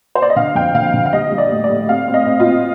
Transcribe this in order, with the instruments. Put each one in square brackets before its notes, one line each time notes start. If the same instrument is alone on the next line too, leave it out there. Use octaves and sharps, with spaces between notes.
[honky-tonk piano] C5
D5
D#5
D3 F5
F2 G5
D3 F5
D3
F5
G3 D#5
G3
D5
A2
D5
A2
C4 F5
C4
D#5
C4
F4
C4